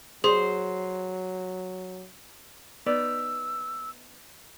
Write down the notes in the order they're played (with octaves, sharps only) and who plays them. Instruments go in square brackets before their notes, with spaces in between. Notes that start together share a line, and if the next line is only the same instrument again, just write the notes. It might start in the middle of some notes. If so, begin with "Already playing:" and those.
[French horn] F#3 [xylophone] G#4 [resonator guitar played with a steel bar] C5
[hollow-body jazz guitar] B3 D#4 [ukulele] D5 [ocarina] E6